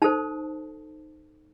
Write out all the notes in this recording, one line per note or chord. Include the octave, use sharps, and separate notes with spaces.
D#4 A4 C5 A5